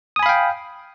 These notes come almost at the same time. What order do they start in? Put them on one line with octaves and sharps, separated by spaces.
D#6 G#5 B5 F5 G5